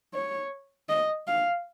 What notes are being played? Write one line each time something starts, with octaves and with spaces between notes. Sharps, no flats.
C#5
D#5
F5